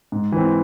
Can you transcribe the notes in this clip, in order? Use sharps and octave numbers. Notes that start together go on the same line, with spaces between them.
G#2
E3 C4